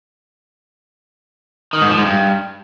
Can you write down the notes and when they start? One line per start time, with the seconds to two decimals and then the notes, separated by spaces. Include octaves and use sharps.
1.73 D#3
1.81 G#2
1.89 F3
1.98 G#2
2.06 G2